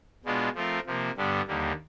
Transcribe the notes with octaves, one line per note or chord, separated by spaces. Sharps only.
B2 G#3 B3 D4 F4
F3 A3 C4 F4 A#4
C3 F3 A#3
G2 D3 G3 B3 D4
D#2 D3 G3 A#3